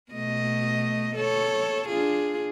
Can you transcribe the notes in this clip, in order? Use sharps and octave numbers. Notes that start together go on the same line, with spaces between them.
B2 A3 D#5
A4 C#5
D4 F4 G#4